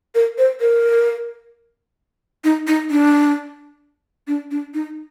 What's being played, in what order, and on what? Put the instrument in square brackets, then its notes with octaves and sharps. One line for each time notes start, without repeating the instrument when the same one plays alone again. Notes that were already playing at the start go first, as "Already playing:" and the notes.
[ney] A#4
C5
A#4
D#4
D#4
D4
D4
D4
D#4